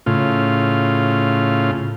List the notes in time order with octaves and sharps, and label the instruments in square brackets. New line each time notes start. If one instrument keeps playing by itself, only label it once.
[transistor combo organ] A2 C#3 F4